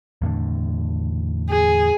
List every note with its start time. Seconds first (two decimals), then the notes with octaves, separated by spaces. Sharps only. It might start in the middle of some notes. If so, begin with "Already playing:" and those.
0.22 E2 A2 D3
1.50 G#4